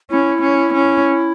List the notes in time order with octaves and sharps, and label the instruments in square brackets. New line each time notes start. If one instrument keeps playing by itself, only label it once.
[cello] C#4 [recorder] E4
[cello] C#4
C#4